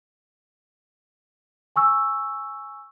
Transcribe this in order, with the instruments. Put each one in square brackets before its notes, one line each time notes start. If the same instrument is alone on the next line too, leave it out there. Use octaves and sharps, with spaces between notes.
[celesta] G#5 C#6 E6